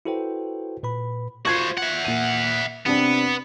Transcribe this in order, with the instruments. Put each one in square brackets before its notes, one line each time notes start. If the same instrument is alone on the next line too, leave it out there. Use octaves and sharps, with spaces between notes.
[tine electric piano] E4 F#4 A4 B4 C5 G5
A#2 B4 B5
[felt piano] F4 G#6 [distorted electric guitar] F#4 C5
[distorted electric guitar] E5 F#5
[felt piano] A#2 D#7
[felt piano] C3 C4 D4 [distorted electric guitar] B3